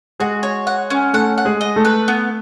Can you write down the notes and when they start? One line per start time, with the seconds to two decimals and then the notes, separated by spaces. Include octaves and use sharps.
0.20 G#3 F#4 G#4
0.43 C#5
0.67 F#5
0.90 C#4
1.13 A3 A4 F#5
1.38 F#5
1.45 G#3 G#4
1.61 D#5
1.76 A3 A4
1.85 B4
2.08 B3